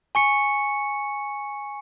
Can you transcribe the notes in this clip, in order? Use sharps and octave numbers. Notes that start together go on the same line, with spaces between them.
G#5 C#6 C#7